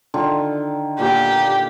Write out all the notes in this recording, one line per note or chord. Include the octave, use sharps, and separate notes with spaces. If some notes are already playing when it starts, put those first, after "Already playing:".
D3 D#3 F4
A#2 A#3 B3 G4